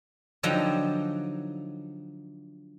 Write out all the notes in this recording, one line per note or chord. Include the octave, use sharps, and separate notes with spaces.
D3 F3 F#3 D#4 G5